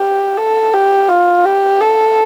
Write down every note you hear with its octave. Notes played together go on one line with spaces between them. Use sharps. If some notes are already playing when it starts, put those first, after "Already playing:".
Already playing: G4
A4
G4
F4
G4
A4